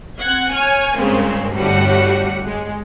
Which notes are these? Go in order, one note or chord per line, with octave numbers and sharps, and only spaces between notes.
C4 F#5 G#6
C#5 G#5 F6 G#6
G2 A#2 C#3 G#3 C4
G1 A2 G3 F#4 F#5
G#3